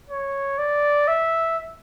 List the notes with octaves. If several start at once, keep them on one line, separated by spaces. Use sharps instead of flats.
C#5
D5
E5